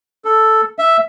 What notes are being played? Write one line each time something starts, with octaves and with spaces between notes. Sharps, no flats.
A4
E5